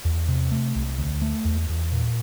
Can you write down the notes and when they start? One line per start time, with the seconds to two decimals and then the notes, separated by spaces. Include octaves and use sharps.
0.05 E2
0.28 C3
0.52 A3
0.75 C2
0.98 D2
1.22 A3
1.45 E2
1.69 E2
1.92 A#2